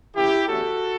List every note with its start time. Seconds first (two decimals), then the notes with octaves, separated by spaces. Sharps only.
0.16 C#3 E3 A3 E4 G4
0.48 E2 D3 A3 C#4 F#4 A4